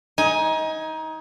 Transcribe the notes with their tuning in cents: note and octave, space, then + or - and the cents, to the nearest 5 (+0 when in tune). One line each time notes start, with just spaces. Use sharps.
D#4 +25 G#5 +0